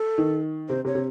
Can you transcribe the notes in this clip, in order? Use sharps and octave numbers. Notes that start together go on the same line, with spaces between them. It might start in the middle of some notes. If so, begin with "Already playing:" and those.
Already playing: A4
D#3
C3 C5
C3 C#5
C3